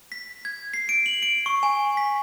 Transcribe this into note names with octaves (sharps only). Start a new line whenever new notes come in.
B6
G#6
C7
D7
F#7
D7
C#6
G#5
B6